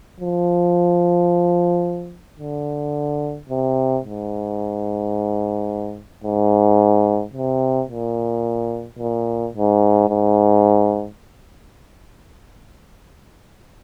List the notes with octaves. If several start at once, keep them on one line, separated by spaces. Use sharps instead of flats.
F3
D3
C3
G#2
G#2
C3
A#2
A#2
G#2
G#2